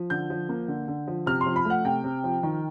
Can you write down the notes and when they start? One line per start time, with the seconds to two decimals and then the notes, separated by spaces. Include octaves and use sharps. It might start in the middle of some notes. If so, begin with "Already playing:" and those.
Already playing: F3
0.10 D3 G6
0.30 F3
0.49 A#3
0.68 D3
0.88 D3
1.07 F3
1.26 C3 F6
1.41 C6
1.46 F3
1.56 B5
1.65 A3
1.70 F#5
1.84 C3 G5
2.04 C3
2.24 F3
2.43 D#3